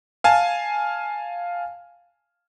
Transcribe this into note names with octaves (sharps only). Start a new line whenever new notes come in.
F5 G#5 A5